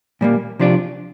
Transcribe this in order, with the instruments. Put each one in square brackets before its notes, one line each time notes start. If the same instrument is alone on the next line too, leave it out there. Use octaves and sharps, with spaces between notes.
[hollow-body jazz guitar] A#2 G3 A#3
C3 F3 D4 F4 D5